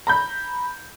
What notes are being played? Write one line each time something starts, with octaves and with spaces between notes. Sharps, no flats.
A#5 B5 G6